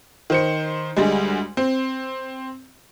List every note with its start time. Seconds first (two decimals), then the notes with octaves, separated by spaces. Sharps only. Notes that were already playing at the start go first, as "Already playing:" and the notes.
0.30 D#3 C5 C#7
0.97 D2 G3 G#3
1.57 C4